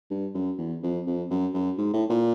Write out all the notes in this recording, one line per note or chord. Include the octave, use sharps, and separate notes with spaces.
G2
F#2
E2
F2
F2
F#2
F#2
G#2
A2
A#2